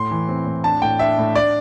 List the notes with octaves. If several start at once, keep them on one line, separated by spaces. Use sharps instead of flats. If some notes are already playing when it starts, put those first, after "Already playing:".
Already playing: A2 C6
E3
C4
A2
D4 A5
A2 G5
D4 E5
A2
D4 D5